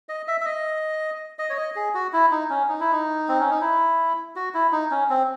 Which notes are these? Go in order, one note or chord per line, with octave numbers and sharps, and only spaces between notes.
D#5
E5
E5
D#5
D#5
C#5
D#5
G#4
F#4
E4
D#4
C#4
D#4
E4
D#4
C4
C#4
D#4
E4
F#4
E4
D#4
C#4
C4